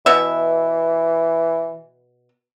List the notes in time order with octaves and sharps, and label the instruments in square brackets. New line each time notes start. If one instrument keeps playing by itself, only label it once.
[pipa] B2 B3 E5 [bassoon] E3